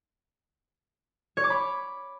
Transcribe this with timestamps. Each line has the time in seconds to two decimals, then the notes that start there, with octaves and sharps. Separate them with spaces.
1.37 C#5
1.44 D6
1.50 B5